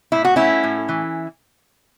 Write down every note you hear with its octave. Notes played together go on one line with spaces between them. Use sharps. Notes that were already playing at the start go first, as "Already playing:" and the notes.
A2 E4
F#4
A3 C#4 E4
A2
E3